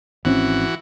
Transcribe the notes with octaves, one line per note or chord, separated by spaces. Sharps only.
G#1 E3 C4 C#4 F#4